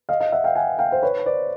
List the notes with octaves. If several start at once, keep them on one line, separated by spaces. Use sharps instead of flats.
D#5 F5
D#5 F5
E5 F#5
F5 G5
F#5 G#5
F5 G5
C5
B4 C#5
C5 D5